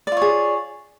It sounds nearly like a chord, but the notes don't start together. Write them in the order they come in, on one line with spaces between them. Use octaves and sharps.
D5 F4 C#5 G#4